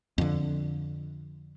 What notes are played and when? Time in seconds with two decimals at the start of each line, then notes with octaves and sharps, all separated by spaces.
0.18 F2 D3